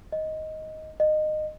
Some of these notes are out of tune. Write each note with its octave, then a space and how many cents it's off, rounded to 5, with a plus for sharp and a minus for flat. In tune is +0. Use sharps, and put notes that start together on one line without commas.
D#5 +10
D#5 -20